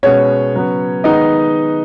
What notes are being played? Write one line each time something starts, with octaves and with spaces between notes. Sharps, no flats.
B2 G#3 B3 C#4 C#5
C#3 F#3 B3
D#3 G#3 B3 D#4 D#5